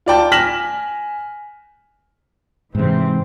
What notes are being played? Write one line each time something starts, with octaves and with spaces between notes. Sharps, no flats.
F4 D5 G5 A5
G#5 F6 A#6 B6 E7 F#7
G#2 C3 E3 C4